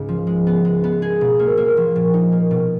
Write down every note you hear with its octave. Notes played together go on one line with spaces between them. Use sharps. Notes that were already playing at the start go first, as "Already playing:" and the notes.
Already playing: C#2 G#2 C#3 C#4
F3
G#3
B3
G#3
B3
G#4
B2
A#3
A#3
F3
A#2
D#4
A#3
B2